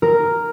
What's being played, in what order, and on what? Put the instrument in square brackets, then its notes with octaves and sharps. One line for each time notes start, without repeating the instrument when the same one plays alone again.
[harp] A#4